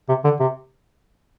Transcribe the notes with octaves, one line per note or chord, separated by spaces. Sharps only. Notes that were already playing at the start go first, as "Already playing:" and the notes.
C3
D3
C3